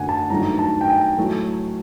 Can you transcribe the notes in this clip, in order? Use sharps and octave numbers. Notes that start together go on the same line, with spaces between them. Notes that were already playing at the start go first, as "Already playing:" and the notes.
Already playing: F#2 D3 F#3 A3 F#5 G#5
A5
G2 D#3 F#3 A3 A#5
A5
G5
G#5
A2 F#3 A3